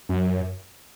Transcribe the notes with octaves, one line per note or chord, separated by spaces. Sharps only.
F#2